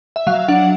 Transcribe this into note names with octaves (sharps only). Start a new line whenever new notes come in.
E5
F#3 F5
D4 F#5